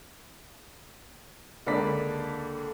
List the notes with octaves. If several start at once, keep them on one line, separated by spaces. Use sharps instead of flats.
C#2 D3 A#3 D5 B5 B6